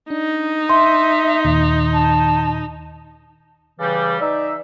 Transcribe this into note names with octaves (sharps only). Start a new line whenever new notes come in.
D4 D#4
E5 C6
D#2 A#2 D#3
A5
C#3 E3 G3
D#4 D5 E5